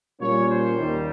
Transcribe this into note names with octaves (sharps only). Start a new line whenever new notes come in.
A#2 G3 A#3 C#4 C#5
C5
D#2 D#3 G3